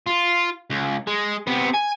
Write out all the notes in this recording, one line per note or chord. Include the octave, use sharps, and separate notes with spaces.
F4
C#2
G#3
C3 B3
G#5